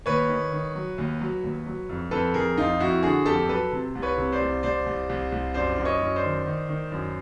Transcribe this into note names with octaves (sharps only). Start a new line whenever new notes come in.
D#2 B4 C#5
D#3
D#3
F#3
D#2
F#3
D#2
F#3
F2
F2 A4 B4
F2 G#4 A#4
F2 D#4 F4
F2 E4 F#4
D3 F#4 G#4
F2 G4 A4
F#3 A4 B4
C3
C2
B4 C#5
C3
C5 D5
C2
C2 C5 D5
C2
C2
C2
F#2 C5 D5
F#2
C#5 D#5
F#2
C5 D5
D#3
D#3
D#3
F#2